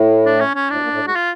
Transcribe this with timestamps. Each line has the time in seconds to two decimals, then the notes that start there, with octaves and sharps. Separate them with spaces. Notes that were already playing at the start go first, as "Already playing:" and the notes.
Already playing: A2
0.25 D4
0.40 C#4
0.55 C#4
0.69 A2 D4
0.76 B2
0.81 A#2
0.92 A2
1.03 G#2
1.08 F#4
1.15 F4